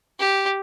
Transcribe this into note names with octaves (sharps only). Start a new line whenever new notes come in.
G4